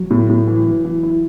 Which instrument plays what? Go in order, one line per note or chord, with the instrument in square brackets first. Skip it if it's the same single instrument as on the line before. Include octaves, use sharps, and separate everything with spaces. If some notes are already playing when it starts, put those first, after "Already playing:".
Already playing: [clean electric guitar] F#3
[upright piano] A2
A2
E3
E3
E3
E4